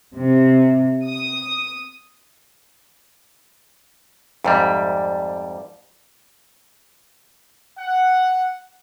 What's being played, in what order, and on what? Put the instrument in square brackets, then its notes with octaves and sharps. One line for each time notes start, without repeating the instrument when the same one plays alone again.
[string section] C3
D#6
[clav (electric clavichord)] F2 G#2 G3 [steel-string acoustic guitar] D5 E5
[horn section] F#5